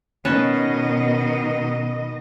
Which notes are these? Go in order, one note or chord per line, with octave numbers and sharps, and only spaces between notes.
B2 D#3 C#4 B4 D#5 A5